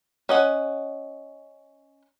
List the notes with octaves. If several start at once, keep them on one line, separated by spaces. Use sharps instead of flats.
C#4 D#5 F#5